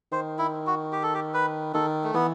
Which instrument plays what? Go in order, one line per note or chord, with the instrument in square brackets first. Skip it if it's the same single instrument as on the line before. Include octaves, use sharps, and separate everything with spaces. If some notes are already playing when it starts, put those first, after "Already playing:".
[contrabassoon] D#3 [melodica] C5
[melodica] E4
F#4
G4
A4
G4
B4
[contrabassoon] D#3 [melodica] A4
[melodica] A3
[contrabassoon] E3 [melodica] B3